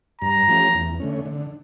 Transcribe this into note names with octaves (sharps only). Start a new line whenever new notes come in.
G2 A#5
F3 A3 C#4 G4
E2
D3 A3 C#4
D3